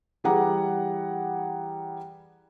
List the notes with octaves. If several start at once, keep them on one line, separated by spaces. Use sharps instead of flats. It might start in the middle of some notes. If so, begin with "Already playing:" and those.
E3 G3 G#4 F#5 A#5 D6